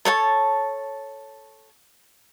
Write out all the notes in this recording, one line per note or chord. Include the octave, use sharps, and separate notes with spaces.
A4 C#5 A5